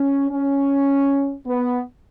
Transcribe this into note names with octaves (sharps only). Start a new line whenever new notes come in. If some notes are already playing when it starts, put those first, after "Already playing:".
Already playing: C#4
C#4
B3